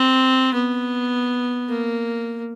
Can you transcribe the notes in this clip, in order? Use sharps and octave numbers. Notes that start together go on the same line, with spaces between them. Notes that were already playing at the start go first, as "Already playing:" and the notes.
Already playing: C4
B3
A#3